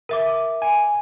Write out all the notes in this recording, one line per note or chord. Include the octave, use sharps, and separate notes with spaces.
A#4 E5 D6
G#5